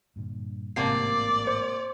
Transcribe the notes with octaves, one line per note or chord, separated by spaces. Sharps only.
G2 A#2 D3
A1 G#2 C3 A#3 D5 C7
C5